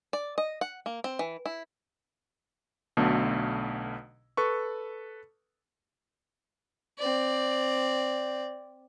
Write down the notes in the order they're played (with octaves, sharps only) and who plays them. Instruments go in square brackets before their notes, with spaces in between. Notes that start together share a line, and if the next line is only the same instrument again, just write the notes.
[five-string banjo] D5
D#5
F#5
A#3
C4
E3
E4
[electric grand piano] B1 B2 D3 A3
A4 B4 C#6
[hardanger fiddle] C4 D5